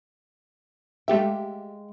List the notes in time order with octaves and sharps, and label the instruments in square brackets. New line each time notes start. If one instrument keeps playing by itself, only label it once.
[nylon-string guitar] G#3 F5 G5 [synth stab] A3 G4 E5